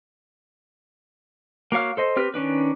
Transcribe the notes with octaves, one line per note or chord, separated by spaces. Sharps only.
A#3 F#4 C#5 F5 F6
A4 C5 D#5
C4 G4 B4 F6
D#3 C#4 D4 B4